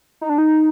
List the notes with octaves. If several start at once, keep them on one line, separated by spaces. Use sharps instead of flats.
D#4
D4
D#4